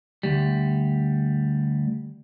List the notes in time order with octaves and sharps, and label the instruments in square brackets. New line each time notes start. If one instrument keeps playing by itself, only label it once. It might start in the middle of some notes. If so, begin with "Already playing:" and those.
[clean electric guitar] D2 G3